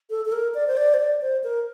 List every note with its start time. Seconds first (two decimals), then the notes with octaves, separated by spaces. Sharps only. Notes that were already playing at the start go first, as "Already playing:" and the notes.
0.10 A4
0.25 A4
0.32 A#4
0.54 D5
0.67 C5
0.77 D5
0.94 C5
0.99 D5
1.21 C5
1.44 A#4